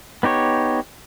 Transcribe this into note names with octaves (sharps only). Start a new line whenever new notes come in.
B3 D#4 G4 C#5